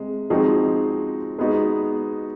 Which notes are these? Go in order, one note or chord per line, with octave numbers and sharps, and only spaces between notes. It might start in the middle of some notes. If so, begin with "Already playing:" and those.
Already playing: C3 G#3
F3 G#3 C4 D#4 F#4
G#3 B3 D#4 F#4